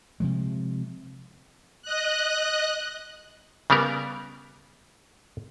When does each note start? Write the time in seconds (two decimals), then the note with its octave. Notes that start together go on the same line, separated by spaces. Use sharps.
0.20 C3 F3 G#3
1.82 D#5 F#6
3.70 C#3 G3 B3 A#4